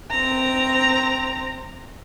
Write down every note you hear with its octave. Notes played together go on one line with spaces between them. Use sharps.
C4 A#5